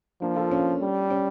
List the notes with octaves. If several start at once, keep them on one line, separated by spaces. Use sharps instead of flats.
F3 A#3 D4
F4 A4
C#4
G3
C#4